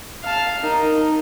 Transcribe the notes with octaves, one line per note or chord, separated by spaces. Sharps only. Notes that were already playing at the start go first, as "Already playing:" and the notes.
F5 A5
D#4 A#4